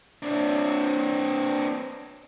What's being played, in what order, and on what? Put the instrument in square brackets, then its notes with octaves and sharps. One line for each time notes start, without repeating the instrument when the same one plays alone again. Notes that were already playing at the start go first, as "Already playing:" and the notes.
[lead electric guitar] C4 D4